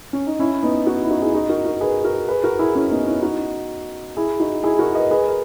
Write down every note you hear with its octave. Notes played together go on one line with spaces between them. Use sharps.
C#4
D#4
C#4 E4
B3 D#4
D#4 F#4
E4
D#4 F#4
E4 G#4
D#4 F#4
F#4 A#4
F#4 A#4
G#4 B4
F#4 A#4
G#4 B4
F#4 A#4
E4 G#4
C#4 E4
B3 D#4
C#4 E4
D#4 F#4
E4 G#4
D#4 F#4
E4 G#4
F#4 A#4
B4 D#5
G#4 B4
A#4